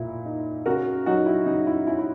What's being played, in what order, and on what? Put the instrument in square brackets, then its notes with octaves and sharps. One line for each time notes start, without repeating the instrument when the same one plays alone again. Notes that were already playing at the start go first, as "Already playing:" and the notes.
Already playing: [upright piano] A#2 E4
D#4
C#3 F#4 A#4
F#3 D#4 F#4
E4
C#3 D#4
E4
C#4 E4
E4